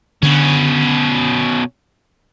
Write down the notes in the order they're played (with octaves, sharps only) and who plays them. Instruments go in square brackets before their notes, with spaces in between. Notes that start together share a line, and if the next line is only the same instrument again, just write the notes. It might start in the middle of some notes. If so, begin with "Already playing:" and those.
[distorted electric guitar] B2 C#4 [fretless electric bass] D3